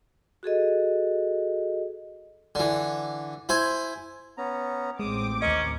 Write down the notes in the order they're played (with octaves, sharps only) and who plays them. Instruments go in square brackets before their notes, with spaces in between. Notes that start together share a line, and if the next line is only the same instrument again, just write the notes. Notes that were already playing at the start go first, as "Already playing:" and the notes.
[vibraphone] F#4 G#4 A4 D#5
[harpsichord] D3 E3
E4 C5 G#5
[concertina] B3 C#4 A#5
[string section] A1 C4 D6 [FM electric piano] G#3 [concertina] D#6
[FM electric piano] D#2 D#5 [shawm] C#4 [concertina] A#4